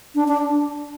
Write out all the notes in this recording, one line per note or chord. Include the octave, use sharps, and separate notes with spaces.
D4
D4